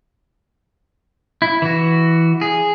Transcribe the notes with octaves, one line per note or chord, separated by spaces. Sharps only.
E4
E3 F#4
G#4